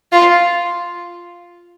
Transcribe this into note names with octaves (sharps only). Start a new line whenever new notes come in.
F4